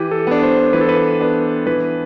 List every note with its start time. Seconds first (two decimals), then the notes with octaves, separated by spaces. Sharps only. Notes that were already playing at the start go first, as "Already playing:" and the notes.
Already playing: E3 G4
0.11 A4
0.27 B3 D4
0.43 C5
0.73 E3 B4
0.81 A4
0.89 B4
1.21 B3 D4
1.66 E3 B4